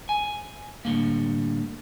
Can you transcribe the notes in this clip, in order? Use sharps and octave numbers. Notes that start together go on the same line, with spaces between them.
G#5
A2 D3 G3 A#3